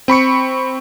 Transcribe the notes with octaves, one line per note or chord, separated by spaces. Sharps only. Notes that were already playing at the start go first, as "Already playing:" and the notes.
C4 B5 C#6 C#7